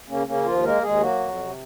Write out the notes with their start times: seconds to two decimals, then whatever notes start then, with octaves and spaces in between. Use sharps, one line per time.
0.08 C#3 A#3 C#4
0.27 C#3 A#3 C#4
0.45 D#2 F3 F4
0.64 G#3 A#3 A#4
0.82 D#2 G#3 G#4
1.00 F#3 A#3 F#4
1.19 F2
1.37 C3